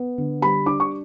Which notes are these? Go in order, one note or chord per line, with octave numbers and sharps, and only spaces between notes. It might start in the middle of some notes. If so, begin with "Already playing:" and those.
Already playing: B3
D3
G3 B5
D4 D6
C#6